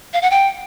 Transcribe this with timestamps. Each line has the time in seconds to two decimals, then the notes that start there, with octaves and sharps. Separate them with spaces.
0.13 F5
0.22 F#5
0.31 G5